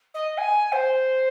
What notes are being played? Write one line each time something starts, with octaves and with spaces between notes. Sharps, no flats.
D#5
G#5
C5